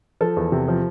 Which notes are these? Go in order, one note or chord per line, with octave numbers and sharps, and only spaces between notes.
F3 A4
E2
C3
F3